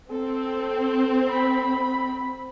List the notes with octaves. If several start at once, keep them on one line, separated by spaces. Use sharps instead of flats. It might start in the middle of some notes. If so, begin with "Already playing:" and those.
C4 A4
B5